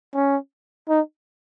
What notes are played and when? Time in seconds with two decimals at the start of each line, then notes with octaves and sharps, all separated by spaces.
0.14 C#4
0.89 D#4